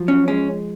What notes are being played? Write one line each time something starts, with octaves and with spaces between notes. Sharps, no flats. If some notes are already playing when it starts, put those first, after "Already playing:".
Already playing: F3 F#3
C#4
G#3 C#4